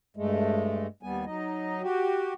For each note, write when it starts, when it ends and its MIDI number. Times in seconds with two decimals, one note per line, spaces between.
0.17 0.87 43
0.17 0.87 56
0.17 0.87 57
1.03 1.25 39
1.03 1.25 55
1.03 1.25 59
1.03 1.25 80
1.26 1.82 54
1.26 1.82 63
1.26 1.82 75
1.82 2.34 66
1.82 2.34 67